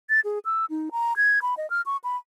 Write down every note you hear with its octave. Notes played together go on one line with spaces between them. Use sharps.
A6
G#4
E6
D#4
A#5
G#6
B5
D#5
F6
C#6
B5